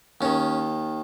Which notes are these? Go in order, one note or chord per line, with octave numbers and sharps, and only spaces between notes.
D#2 D#3 C#4